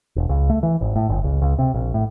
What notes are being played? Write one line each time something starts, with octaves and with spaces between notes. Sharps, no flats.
E1
C#2
A3
E3
G#1
A2
G1
C#2
C#2
C3
A#1
A2